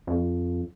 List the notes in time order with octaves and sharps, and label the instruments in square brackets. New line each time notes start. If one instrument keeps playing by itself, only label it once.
[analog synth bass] F2